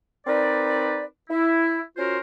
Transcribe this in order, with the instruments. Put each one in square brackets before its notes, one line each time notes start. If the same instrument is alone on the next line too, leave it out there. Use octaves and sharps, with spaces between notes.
[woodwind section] C4 D#4 A#4 B4 D5
E4
C#4 F4 F#4 A#4 C5